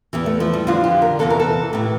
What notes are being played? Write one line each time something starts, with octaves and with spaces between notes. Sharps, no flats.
E2 E3 G4
A3
F3
G3
F2 D3 F3 F4
G4
A#4
E2 C3 E3 A4
A#4
A4
A2 E3 G4